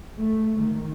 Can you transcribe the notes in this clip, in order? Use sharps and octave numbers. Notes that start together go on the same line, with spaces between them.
A3
D#3